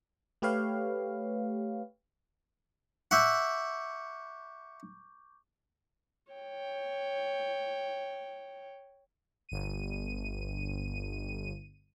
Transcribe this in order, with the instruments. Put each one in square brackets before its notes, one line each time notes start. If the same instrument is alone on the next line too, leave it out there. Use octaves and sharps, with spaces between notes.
[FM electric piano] A3 G4 B4 C#5 F5
[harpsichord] E5 F#5 [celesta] C#6 D6 G6
[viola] C#5 G5
[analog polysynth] G1 D#7